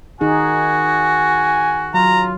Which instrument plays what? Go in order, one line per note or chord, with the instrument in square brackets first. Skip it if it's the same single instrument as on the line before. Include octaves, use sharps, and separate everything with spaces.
[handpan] D#3 D#4 G#4 [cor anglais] F#4 [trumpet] G#5
[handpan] F#3 [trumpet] F4 [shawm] A#5